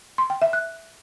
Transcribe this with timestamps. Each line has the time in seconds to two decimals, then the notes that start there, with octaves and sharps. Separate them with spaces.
0.18 C6
0.30 G5
0.42 E5
0.53 F#6